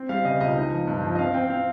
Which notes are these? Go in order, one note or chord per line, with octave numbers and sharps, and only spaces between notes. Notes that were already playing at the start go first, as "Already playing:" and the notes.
Already playing: C4
G3 F5
C#3 D#5
C#2 D#5
D#4
F3
G2
F3
D#5
C4 F5
C4 G5
C4 F5